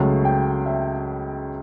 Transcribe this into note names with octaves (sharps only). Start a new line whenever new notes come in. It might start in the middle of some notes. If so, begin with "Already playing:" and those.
Already playing: C#2 C#3 F#3 A3 C#4 A5
G5
E5